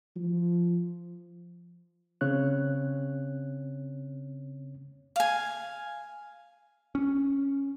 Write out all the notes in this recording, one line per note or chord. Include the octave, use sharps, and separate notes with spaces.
F3
C#3 C4 C#5 F#6
F5 G#5
C#4